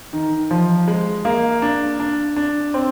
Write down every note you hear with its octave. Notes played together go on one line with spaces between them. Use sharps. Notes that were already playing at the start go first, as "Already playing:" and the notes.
D#3
F3
G#3
A#3
D4
D4
D4
C4